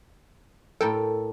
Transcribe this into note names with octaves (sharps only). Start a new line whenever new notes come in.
A2 A4 A#4 G5